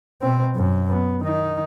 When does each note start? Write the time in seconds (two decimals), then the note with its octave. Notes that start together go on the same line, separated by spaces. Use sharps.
0.22 B2 C4
0.56 F#2
0.90 B3
1.21 D#3 D#4